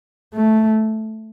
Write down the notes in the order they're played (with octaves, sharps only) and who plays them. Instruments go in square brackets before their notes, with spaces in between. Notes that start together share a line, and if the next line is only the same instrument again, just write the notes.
[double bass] A3